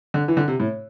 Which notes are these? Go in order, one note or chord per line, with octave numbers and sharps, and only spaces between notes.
D3
E3
D3
C3
A2